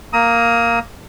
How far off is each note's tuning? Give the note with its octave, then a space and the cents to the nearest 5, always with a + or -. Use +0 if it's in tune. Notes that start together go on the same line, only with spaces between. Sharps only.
A#3 +0 A#5 +0 D#6 +30